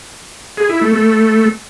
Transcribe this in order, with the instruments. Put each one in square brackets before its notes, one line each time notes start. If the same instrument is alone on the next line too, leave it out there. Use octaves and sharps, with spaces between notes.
[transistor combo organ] G#4
E4
A3
A3